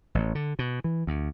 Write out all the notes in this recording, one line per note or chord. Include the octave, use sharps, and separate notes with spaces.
A1
D3
B2
E3
D2